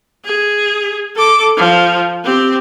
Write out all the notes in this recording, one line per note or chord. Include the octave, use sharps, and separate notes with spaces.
G#4
A4 D6
F3
C4 G4